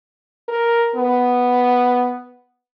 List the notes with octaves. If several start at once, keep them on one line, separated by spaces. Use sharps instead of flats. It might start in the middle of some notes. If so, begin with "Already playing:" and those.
A#4
B3